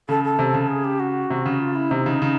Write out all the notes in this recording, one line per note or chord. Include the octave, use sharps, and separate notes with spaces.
C#3 A4
A4
C3
C#3
G#4
G4
F#4
C3
C#3
F4
E4
C3 D#4
C#3
C#3